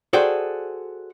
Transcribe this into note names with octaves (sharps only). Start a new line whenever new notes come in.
F#4 G#4 A4 C5 D5 G5